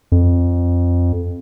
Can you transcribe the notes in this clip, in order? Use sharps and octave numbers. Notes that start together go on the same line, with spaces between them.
F2